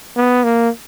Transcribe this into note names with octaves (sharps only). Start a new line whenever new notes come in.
B3
A#3